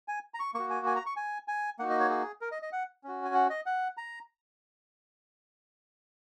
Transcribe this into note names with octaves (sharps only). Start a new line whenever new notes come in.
G#5
A#5
C#6
A#3 F#4 C#6
G#5
G#5
A#5
C#6
G#5
G#5
A#3 D#4 F#4 F#5
D#5
C#5
G#4
A#4
D#5
D#5
F#5
C#4 F#4
G#5
F#5
D#5
F#5
A#5